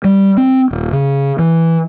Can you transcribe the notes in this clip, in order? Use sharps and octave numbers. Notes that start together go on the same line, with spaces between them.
G3
C4
D#1
C#3
E3